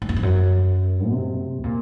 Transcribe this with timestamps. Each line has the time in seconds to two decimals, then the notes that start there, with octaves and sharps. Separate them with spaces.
0.02 G#2
0.09 F#2
0.16 F2
0.23 F#2
1.09 C3
1.64 A#2